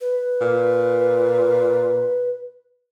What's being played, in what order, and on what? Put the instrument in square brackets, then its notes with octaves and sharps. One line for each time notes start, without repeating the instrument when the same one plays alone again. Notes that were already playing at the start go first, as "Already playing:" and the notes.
[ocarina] B4
[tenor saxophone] A#2